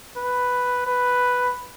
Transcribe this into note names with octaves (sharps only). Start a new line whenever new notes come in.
B4
B4